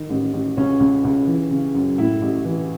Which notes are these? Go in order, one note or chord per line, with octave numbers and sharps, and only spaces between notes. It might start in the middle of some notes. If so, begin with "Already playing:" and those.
Already playing: D#3
A1
A1
C#2 C#4
C#2
C#2
E3
C#3
F#2
A2 E4
A1
E3